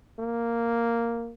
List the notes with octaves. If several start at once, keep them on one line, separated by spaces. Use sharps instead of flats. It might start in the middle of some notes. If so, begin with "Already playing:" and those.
A#3